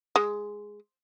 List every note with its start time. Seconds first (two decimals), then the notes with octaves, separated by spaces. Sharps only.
0.16 G#3